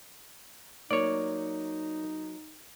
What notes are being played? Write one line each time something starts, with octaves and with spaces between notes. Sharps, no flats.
F#3 A#3 D#4 C#5 D5